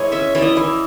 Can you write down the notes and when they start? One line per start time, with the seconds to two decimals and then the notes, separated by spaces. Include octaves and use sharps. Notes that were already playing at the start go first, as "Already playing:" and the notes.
Already playing: E3 G#3 C#5
0.12 C#4 E5
0.35 E3 D5
0.42 D#5
0.57 E3